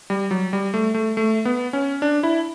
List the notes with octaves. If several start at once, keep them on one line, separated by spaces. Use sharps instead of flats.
G3
F#3
G3
A3
A3
A3
B3
C#4
D4
E4